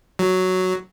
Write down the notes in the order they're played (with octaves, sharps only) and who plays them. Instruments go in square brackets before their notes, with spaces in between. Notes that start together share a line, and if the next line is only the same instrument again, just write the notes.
[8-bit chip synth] F#3